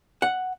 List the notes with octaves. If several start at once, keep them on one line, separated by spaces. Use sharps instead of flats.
F#5